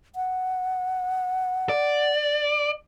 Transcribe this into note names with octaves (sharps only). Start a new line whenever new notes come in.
F#5
D5